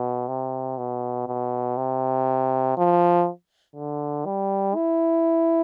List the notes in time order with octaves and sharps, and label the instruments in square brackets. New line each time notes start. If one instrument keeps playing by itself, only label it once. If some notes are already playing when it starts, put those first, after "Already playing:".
Already playing: [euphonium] B2
C3
B2
B2
C3
F3
D3
G3
E4